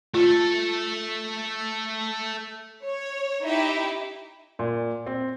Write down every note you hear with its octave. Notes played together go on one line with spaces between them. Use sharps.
A3 F4 A4
C#5
D#4 E4 G4 E5
A#2
C4